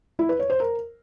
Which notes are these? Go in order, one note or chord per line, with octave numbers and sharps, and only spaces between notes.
E4
B4
C#5
C5
A#4